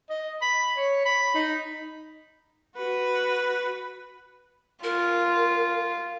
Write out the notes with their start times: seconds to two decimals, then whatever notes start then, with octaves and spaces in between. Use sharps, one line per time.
0.10 D#5
0.41 B5
0.77 C#5
1.06 B5
1.35 D#4
2.76 F#4 B4
4.84 F4 A#4